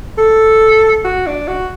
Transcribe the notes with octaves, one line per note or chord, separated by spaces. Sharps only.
A4
F#4
D4
F#4